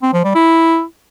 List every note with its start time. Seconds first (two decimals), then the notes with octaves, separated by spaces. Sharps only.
0.03 C4
0.13 F3
0.24 G3
0.35 E4